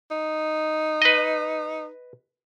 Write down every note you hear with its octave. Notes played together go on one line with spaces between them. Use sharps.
D#4
B4 D#5